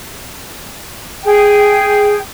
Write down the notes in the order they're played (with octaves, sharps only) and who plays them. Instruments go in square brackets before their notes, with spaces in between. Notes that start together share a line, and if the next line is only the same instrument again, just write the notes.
[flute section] G#4 G5